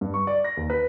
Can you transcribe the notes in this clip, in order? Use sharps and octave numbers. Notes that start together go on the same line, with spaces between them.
G2
C#6
D5
A#6
D#2
B4